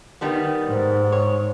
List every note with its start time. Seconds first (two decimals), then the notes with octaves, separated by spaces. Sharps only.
0.21 D#3 G3 B3
0.67 G#2
1.12 C#5